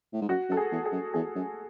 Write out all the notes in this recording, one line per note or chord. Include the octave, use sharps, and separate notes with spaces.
A2
G#2
F#2 F#4
F#2 A4
G#4
E2
G#4
F#2
E2 G#4
F#2